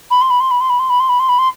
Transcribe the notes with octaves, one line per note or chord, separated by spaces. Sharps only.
B5
C6
B5
C6
B5
C6
B5
C6
B5
C6
B5
C6
B5
C6